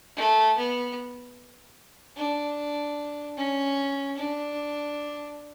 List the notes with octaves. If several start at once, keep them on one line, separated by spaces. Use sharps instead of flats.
A3
B3
D4
C#4
D4